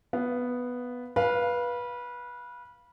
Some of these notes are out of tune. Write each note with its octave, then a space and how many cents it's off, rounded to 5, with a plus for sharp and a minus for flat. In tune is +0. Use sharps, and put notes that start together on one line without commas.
B3 +0 F5 -15
B4 -20 F5 +0